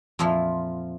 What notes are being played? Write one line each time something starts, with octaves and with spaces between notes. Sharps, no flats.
F2 A#2 F3 E4 F4